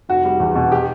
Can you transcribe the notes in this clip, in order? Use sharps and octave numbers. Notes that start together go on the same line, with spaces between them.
F1 F#4
G3
E2
B2
G4